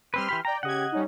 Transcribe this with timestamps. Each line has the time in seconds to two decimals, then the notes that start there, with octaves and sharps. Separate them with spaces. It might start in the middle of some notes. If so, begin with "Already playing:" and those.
0.14 G3 C4 B4 C6 F6
0.29 E3 G4 B5
0.45 D5 G5 A#5
0.63 C#3 G4 D#5 F#5 G#6
0.92 G3 C#4 D#4